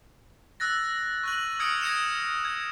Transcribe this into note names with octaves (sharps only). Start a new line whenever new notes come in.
E6 F#6 A6 A#6
C#6 F#6 F#7
D#6 F6 G#6 C#7 D7
G#6 A#6 C#7 E7 F7
G#6